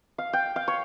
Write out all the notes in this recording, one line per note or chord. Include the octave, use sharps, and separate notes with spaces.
F5
G5
F5
C#5